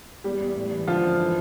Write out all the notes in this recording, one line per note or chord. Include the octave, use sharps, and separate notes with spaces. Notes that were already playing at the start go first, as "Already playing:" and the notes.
E2 G3 G4
E2
A2
E3
D3 F3 F4
F#2
E3